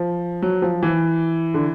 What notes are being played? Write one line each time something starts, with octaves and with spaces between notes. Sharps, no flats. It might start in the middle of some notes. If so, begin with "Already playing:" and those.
Already playing: F3
F#3
F3
E3
D3